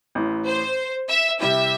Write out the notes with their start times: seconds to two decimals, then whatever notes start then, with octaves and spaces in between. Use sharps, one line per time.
0.15 A1 A2 E3
0.47 C5
1.09 E5
1.40 C3 G3 E4 G4 E5